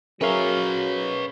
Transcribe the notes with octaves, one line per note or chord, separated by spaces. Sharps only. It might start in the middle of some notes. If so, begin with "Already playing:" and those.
F#3 C#4 G#4 A#4 B4 C#5 E5 F5